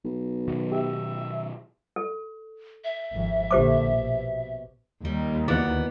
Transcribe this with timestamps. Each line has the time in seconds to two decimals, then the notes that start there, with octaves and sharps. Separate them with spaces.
0.05 B1
0.48 B2 D#3 F#3
0.72 G4 E5
1.96 A4
2.84 E5
3.13 G#1 F2
3.51 A#1 D3 G4 C5 D6
3.93 B2
5.05 D#2 D#3 G3
5.48 D2 E3 B3 D5 F#5